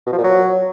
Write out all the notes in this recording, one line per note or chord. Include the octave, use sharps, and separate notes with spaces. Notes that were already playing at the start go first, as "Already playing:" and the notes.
B2
F3
A#2
F#3